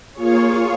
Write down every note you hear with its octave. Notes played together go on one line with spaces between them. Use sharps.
A#3 F4 G#4 C#5